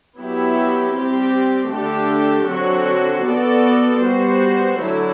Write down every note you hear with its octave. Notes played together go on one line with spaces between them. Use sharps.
F#3 B3 E4 G4
G3 C4 G4
D3 A3 D4 G4
D3 F#3 C4 F#4
B3 F#4 A4 D5
G3 B3 F#4 C5
D3 F#3 A3 E4